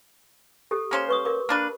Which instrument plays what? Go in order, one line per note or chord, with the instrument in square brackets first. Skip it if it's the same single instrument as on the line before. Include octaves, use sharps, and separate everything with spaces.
[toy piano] G4 A4
[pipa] A#3 C#4 C5
[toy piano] B4 C#6 D#6
A#4 D6
[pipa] A#3 D4 B4